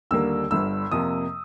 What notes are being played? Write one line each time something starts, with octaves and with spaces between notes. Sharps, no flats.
D#2 D3 G3 A#3 E6
G1 G2 D3 E6
F2 C3 F3 A#3 D#6